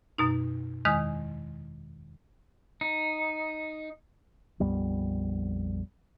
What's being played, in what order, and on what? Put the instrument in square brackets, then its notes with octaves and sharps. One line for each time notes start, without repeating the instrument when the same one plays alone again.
[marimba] F#2 B2 D#4
E2 D#3 G#3 D#6 F6
[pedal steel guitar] D#4
[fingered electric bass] A#1 F2 G3 B3